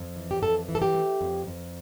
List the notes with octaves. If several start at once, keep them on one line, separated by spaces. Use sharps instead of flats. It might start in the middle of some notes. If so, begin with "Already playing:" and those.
Already playing: F2
E3
G4
F2 A4
E3
A4
G4
A3
F2
F2